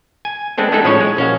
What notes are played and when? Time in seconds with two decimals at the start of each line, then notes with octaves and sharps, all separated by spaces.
0.25 G#5
0.58 G#3 B3 C4 D4 A4
0.72 G#3 A3 D4 D#4 A4
0.84 A2 F3 G#3 C#4 C#5
1.01 G#3
1.17 A#1 C#4 F#4 F5